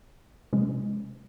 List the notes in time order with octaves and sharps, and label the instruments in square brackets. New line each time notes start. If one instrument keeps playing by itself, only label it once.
[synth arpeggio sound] C3 F3 G#3 C#4